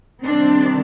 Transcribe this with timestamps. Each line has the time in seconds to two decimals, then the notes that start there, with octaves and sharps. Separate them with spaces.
0.23 C3 D#3 G3 C4 D4